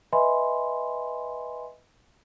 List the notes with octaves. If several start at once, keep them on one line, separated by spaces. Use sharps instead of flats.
B4 D#5 E5 G#5 B5 C6